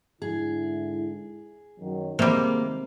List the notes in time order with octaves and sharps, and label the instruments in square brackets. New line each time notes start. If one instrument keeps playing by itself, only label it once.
[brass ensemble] G#2 D3 E4 [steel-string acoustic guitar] G#4
[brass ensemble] F#2 D#3 F#3
[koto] C3 G3 [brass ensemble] D#3 G#3 [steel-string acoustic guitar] A#3